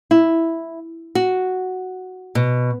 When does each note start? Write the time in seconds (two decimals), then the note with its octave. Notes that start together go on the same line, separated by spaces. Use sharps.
0.11 E4
1.15 F#4
2.35 B2